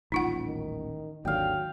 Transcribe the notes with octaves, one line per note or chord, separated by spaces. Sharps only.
D#1 A1 D#4 F4 F#5
D#3
G#1 D#2 D3 F#3 F5 G5